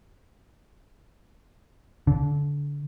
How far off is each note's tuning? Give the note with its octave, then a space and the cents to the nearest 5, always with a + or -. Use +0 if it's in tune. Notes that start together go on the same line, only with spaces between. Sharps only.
D3 -25